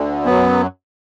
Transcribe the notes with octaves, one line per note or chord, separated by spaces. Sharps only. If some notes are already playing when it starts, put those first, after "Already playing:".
Already playing: D2 D3
F#2 F#3 B3